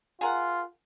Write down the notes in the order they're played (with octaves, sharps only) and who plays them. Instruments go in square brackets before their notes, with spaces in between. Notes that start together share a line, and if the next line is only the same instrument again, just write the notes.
[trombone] F4 [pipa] G#4 A#4 F#5